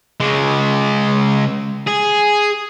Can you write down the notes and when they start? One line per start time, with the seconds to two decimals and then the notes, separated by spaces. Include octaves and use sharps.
0.20 C#3 G#3
1.87 G#4